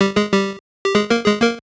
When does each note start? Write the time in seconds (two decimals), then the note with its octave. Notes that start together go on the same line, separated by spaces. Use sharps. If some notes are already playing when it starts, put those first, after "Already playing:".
0.01 G3 G4
0.16 G#3 G#4
0.32 G3 G4
0.85 G4
0.95 G#3 G#4
1.10 A#3 A#4
1.26 G#3 G#4
1.42 A#3 A#4